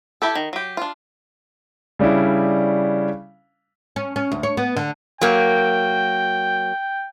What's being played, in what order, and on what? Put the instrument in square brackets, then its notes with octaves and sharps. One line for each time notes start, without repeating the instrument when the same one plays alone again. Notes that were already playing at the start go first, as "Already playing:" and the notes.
[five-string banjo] E4 G4 A4
D#3
F#3 G4
D4 F4
[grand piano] C#3 G3 C#4 D4 E4
[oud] C#4
C#4
D2
C#5
B3
D3
[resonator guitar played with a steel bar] F#3 A#3 [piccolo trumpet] G5